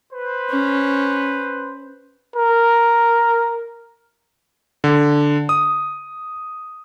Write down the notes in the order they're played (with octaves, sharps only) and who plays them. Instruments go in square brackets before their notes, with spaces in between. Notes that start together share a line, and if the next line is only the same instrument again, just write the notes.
[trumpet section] B4 C5
[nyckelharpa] C#4
[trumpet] A#4
[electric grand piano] D3
D#6